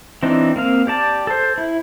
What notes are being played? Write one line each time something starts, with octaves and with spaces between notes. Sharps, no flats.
E3 C4 D4 D#4
A#3 C4 F5
G4 D5 A5
A4 C5
E4